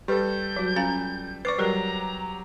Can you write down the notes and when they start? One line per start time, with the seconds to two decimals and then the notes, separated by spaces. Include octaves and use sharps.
0.08 G3 G4 A4 B4 G6
0.56 F#3 F#4
0.76 C#4 F4 F5 A#5
1.45 B4 C5 D5 C#6 D6 C7
1.58 F#3 G3 G4 A#4 A#5